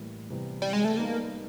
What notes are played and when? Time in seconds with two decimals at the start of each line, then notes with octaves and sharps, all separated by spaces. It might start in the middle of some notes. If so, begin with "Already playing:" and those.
Already playing: A2 E3 G3 A#3
0.30 C3 E3 G3 B3
0.62 G3
0.73 G#3
0.85 A3
0.97 G3 A#3 B3 D#4